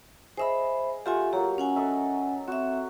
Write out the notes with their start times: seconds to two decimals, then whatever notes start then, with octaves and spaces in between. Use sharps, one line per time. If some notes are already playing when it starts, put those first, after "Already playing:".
0.37 G#4 C5 D#5 E5 B5 E6
1.06 A3 F4 G4 E5 F#5 G#5
1.33 F#3 A#3 G4
1.58 C#4 F#5 G#5
1.76 A4 D#5 E5
2.48 C4 F#4 E5